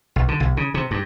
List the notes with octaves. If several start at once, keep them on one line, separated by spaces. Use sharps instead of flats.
B1
D3
B1
C#3
C3
G2